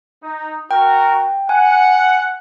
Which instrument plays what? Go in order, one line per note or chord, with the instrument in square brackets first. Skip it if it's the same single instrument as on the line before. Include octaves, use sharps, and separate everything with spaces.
[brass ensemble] D#4
[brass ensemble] F#4 A#4 [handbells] G5
[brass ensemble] F#5 [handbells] G#5